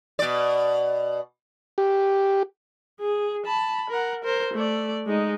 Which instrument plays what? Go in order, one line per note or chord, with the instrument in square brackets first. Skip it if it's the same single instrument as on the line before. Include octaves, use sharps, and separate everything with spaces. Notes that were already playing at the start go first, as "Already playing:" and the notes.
[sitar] B2 D5
[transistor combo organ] G4
[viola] G#4
A5 B5
A#4 F#5
A#4 C5
A3 D5
G#3 D#4